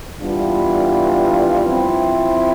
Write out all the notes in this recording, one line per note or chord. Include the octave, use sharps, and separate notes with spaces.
E3 G3 B3 D4 F4
F3 C4 E4